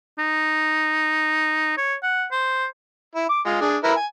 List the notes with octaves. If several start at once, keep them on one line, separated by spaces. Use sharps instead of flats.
D#4
C#5
F#5
C5
E4
D6
G#3 F4
D4 G#4
E4 A#4 B4
G#5